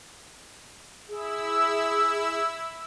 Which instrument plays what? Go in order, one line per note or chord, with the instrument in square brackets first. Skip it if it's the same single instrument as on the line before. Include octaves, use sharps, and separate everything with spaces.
[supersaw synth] E4 E6 [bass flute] G#4